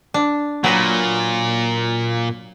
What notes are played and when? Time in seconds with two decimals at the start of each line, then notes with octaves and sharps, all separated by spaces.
0.14 D4
0.64 A#2 F#3 B4 A#5